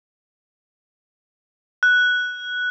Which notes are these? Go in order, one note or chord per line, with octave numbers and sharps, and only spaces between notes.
F#6